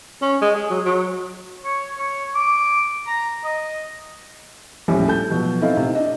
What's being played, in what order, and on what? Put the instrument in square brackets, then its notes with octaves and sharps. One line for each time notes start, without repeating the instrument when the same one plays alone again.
[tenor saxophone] C#4
G#3
G#4
F#3
F#3
[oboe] C#5
C#5
D6
A#5
D#5
[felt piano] D#1 A#1 A2 C#4 G4
A4 A5 G6
B2 F3 F#3
C4 D#4 E4 A4 D#5 F5
C3 D#3
D4 D#5